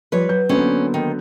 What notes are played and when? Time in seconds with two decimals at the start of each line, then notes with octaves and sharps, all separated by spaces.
0.12 F3 G3 B4 C#5
0.29 F#3 G6
0.49 D3 F#3 A#3 B3 C#4 C5
0.94 D#3